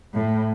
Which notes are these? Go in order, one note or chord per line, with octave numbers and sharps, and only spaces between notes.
A2